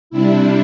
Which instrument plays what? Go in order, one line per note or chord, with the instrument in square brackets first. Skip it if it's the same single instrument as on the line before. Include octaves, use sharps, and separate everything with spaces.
[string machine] C3 G3 D4 E4